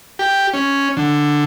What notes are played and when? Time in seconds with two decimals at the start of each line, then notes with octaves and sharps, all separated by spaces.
0.19 G4
0.54 C#4
0.97 D3